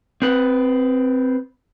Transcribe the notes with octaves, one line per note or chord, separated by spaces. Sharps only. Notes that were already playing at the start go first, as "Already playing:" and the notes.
C4 B4